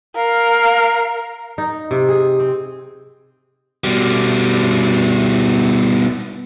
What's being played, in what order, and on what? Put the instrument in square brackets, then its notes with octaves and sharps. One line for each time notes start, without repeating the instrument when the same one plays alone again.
[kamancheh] A#4 [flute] F5
[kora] D#4
C3
G#4
C4
[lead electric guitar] B2 G3